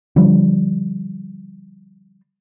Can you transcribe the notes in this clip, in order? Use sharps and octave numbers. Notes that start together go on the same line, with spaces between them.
D3 F3 G3